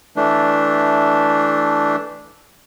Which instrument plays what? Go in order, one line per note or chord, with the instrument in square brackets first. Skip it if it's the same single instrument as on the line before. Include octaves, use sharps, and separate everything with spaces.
[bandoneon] E3 A3 D4